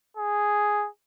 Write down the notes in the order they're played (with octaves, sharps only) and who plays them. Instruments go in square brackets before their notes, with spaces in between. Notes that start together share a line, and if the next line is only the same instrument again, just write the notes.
[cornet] G#4